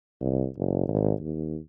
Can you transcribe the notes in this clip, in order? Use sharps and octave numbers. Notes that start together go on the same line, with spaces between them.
C2
F#1
G#1
D#2